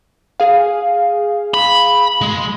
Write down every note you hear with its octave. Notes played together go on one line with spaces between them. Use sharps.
G#4 F5
B5
G#3